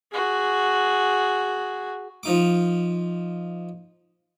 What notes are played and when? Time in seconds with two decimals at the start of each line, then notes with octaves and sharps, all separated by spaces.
0.13 F#4 G#4
2.23 F3 D#4 D6